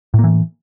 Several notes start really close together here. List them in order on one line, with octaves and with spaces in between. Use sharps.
A2 A#3 E3